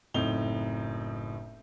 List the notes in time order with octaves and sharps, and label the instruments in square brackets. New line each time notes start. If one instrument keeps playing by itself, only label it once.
[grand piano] F#1 A2 C4 D#4 F7 G7